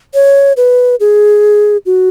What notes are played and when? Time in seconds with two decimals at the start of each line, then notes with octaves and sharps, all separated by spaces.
0.14 C#5
0.57 B4
1.00 G#4
1.86 F#4